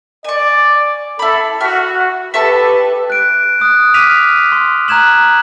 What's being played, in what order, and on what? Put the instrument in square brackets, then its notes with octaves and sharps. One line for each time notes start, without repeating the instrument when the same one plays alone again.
[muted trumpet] D5 [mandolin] G#5 C#6
[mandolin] E4 B5 [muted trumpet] A4
[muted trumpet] F#4 [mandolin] E5 F6
[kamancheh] G4 B4 [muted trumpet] A4 [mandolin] E5 A5 C#6
[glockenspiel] F#6 D7
D#6 F#6
D6 F6 B6 D#7 F7
C6
A#5 F#6 G#6 E7 F#7